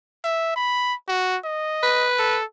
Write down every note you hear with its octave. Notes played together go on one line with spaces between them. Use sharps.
E5
B5
F#4
D#5
B4
A4